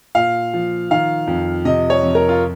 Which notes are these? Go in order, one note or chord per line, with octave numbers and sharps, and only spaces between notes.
A#2 F5
F3
D#3 F5
F2
C3 D#5
C#5
F2
A#4
F4